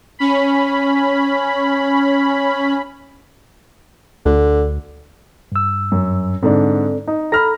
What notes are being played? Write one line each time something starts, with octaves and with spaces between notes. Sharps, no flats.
C#4 B5
D2 D3
G2 E6
F#2
G#2 D3 C4 A4 D5
D#4
A4 A#5 B5 F6 A#6